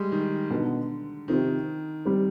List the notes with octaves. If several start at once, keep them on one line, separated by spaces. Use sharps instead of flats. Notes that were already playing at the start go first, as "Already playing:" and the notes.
Already playing: G3 G#3
D#3
B2 D3 B3 D#4
C3 D#3 F3 C4 F4
G3 C4